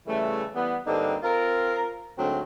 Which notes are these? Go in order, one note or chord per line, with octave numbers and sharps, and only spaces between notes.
C#3 E3 G3 A3
E3 G3 B3
G2 D3 A#3 C4 D#4
C4 F4 A#4
D2 G#2 F#3 A3 C4